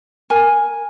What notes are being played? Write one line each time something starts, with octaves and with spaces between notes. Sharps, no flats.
A#4 G#5